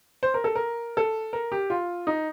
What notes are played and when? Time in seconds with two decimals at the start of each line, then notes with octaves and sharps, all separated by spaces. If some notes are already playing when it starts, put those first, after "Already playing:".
0.23 C5
0.34 A#4
0.44 A4
0.55 A#4
0.97 A4
1.33 A#4
1.52 G4
1.70 F4
2.07 D#4